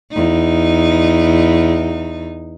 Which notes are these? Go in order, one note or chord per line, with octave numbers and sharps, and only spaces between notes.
E2 D#4